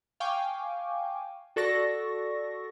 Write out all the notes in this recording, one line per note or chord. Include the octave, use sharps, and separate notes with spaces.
F5 G5 G#5 C#6 D6
F#4 A4 D5 C#6 A#6